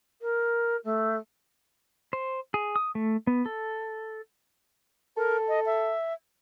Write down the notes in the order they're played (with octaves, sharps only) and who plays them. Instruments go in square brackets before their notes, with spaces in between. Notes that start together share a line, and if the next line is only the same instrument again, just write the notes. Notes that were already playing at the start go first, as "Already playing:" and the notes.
[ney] A#4
A3
[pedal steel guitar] C5
G#4
D#6
A3
B3
A4
[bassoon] A4 [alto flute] A#4
[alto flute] D#5
E5